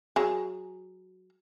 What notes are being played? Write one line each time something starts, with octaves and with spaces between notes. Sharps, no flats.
F#3 G#4